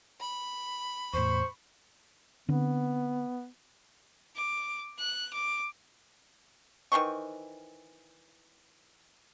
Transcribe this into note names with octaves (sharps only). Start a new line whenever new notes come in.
B5
E2 A2 C5 C#6
D3 B3 C4
D6
F#6
D6
D#3 E3 C5 C#6